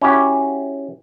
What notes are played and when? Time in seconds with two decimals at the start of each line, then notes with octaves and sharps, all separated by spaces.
0.02 C#4 E4 F#4 G4